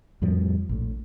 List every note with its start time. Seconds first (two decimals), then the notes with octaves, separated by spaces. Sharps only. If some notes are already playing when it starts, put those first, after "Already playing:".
0.22 F2 A2 F3 G3
0.69 A#1 A2